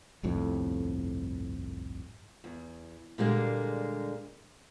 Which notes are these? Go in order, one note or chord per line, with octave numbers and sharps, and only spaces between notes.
G1 C2 F2 A2
E2
A#2 D3 G3 G#3 A#3